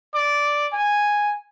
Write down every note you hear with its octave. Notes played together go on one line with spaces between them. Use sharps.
D5
G#5